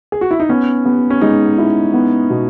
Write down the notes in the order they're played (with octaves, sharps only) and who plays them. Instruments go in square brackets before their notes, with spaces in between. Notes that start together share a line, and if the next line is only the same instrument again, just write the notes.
[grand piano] G#4
F#4
E4
D#4
[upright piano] B3 [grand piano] C#4
[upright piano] B3
[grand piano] C#4
[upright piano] G#3 [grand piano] D#4
[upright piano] E4
B3
B2